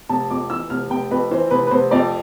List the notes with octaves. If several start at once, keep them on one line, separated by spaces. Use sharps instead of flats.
F1 A5
F2 D6
E3 E6
F1 F6
F1 G5
F2 B4
E3 C5
F1 B4
B4
F1 C5
F2 D5